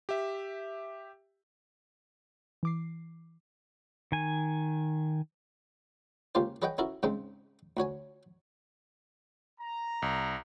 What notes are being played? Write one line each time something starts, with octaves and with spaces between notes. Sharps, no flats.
G4 E5
E3 D6 C7
D#3 G#5
C#2 A#3 C#4 F4 G4 C5
G#4 B4 C#5 D#5 F#5 G5
C#4 E4 F#4 A4 A#4
G#2 C#3 G#3 C4 D#4
D2 F#4 C#5 G#5
A#5
C2